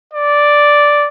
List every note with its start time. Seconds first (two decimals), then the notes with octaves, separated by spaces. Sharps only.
0.13 D5